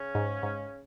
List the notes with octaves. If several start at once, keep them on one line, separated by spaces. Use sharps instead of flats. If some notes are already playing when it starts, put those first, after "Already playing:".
Already playing: C#3 C#4
G#2
G#2